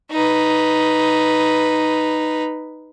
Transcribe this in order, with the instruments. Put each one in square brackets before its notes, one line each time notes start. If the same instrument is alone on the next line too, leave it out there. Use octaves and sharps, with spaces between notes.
[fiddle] D#4 B4